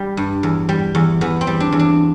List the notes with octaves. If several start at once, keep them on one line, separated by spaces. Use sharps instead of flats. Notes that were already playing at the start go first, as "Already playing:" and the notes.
Already playing: G3
G2
E2
G3
E2
E2 B3
C4
G3
D4
E2
D4